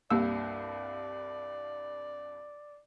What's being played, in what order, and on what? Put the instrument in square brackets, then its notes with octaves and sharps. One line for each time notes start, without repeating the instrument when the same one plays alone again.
[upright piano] C2 G2 [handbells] A#3 E6 [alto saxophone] D5